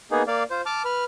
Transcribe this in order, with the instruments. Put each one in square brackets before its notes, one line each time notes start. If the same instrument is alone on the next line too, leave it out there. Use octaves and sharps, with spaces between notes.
[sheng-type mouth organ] A#3 B3 D#4 G#4
A#3 D5 F5
F4 C5
A5 D6 F6
B4 F6